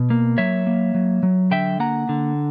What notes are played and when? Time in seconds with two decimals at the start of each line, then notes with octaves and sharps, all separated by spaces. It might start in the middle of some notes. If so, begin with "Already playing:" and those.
Already playing: B2
0.10 A#3
0.38 F#3 C#5 E5
0.67 A#3
0.94 F#3
1.23 F#3
1.51 D3 E5 G5
1.79 A#3 F#5 A#5
2.09 D3